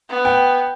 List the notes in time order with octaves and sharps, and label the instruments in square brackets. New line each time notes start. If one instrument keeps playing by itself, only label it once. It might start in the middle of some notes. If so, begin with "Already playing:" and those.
[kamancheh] B3
[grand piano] G5